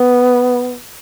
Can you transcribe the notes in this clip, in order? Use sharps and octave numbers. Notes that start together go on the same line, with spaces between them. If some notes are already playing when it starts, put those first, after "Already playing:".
Already playing: B3